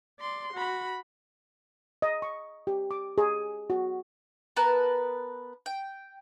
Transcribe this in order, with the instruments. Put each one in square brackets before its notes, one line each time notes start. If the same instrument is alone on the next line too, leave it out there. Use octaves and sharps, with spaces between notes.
[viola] D5 C6
F#4 B5
[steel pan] D#5
C#6
G4
D6
G#4
F#4
[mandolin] B3 A#4 B4 A5
G5